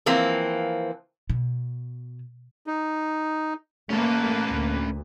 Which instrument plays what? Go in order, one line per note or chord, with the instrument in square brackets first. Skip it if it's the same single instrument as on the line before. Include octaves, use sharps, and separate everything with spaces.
[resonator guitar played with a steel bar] E3 F3 A#3 C4
[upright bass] B2
[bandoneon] D#4
[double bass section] A3 [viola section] A#3 B4 [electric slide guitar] C#4 A4
[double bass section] D2